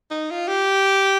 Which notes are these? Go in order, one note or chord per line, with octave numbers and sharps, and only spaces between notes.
D#4
F4
G4